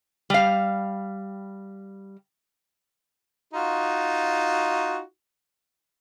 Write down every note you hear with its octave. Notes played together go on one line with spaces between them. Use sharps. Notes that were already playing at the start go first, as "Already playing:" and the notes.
G3 F5
D#4 F4 F#4